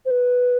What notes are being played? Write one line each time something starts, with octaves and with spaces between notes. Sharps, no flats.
C5
B4